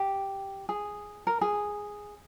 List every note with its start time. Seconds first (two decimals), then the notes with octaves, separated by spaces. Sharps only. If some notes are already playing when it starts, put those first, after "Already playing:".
Already playing: G4
0.69 G#4
1.27 A#4
1.41 G#4